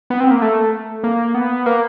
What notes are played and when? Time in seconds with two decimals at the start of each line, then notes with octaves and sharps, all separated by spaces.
0.10 B3
0.20 C4
0.31 A#3
0.42 A3
1.04 A#3
1.35 B3
1.66 A#3